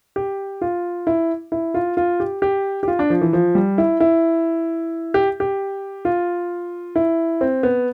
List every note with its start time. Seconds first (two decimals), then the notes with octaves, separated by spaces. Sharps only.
0.16 G4
0.61 F4
1.07 E4
1.52 E4
1.74 F4
1.97 F4
2.20 G4
2.42 G4
2.83 G4
2.88 F4
2.99 D4
3.10 F3
3.21 E3
3.33 F3
3.55 G3
3.78 E4
4.00 E4
5.14 G4
5.40 G4
6.05 F4
6.96 E4
7.41 C4
7.63 B3